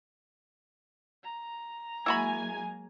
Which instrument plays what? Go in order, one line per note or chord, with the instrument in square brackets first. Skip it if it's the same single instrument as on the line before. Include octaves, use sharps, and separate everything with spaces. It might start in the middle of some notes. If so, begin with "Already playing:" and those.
[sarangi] A#5
[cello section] F#3 A#3 [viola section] G#3 G#5 [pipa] E4 F#4 B5